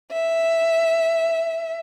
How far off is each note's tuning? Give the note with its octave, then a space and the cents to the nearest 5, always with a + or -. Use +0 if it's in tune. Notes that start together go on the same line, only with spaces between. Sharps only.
E5 +0